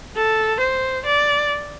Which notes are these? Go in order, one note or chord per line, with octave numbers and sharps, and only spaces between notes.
A4
C5
D5